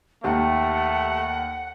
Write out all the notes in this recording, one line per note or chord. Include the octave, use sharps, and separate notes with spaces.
D#2 A3 G4 F#5 G5